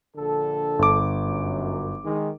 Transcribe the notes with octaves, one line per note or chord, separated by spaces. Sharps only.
A#1 D3 A4
G1 D6
F#2
D#3 G#3